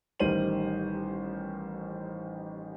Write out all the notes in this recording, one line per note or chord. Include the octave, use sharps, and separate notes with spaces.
A1 D#3 G3 C5 D#7 F#7